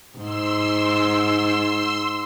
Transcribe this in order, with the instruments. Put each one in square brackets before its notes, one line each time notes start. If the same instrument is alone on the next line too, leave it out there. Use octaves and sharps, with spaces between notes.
[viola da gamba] G#2 [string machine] C6 E6